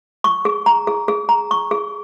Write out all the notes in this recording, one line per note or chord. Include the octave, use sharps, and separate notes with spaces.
C#6
G#4
A#5
G#4
G#4
A#5
C#6
G#4